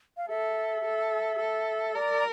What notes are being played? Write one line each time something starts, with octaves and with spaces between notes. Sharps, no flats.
F5
A4 E5
A4
A4
A#4 D5